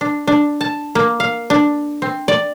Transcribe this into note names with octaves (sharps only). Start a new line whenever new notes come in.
D4
D4
A5
A#3
F5
D4
C4
D5